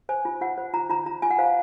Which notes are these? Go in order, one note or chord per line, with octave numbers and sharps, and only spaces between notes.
C5 G#5
F4
F4 F#5
C5
F4 A#5
F4 A#5
F4 A#5
F4 G#5
F#5
C5 F5